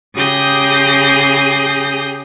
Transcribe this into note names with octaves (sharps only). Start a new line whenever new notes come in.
C#3 G4 G#4 D#6 G6 A#6